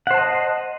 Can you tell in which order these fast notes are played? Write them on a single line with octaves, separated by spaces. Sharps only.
F#5 C5 A5 D#5